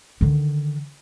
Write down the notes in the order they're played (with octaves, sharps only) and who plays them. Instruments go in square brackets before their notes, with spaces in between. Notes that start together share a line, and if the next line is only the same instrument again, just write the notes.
[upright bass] D3 D#3